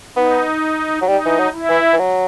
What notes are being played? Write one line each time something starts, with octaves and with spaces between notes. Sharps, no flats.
B3 D#4
F#3
G3 D#4
E3
F#3
E4
E3
E3
F#3